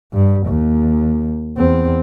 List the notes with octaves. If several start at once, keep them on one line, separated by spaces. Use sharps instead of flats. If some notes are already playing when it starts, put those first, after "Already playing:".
G2
D#2
E2 C4